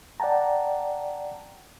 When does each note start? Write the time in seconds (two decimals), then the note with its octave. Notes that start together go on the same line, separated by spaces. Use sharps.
0.20 D5 F#5 G5 A5 A#5